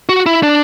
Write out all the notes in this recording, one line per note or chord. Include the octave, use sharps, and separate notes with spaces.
F#4
E4
D4